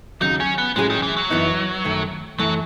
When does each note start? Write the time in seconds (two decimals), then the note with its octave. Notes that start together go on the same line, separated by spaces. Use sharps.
0.21 D#2 C#3 F#3 D#4
0.40 C#4
0.58 B3
0.76 A2 F#3 G#3 C#4 G#4
0.90 D#3
1.03 E3
1.16 F#3
1.30 F#2 E3 B3 D#4
1.85 F#2 D#3 A3
2.39 F#2 E3 F#3 A3